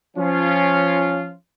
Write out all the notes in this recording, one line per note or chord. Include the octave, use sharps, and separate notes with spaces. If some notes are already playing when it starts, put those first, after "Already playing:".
F3 C#4 F4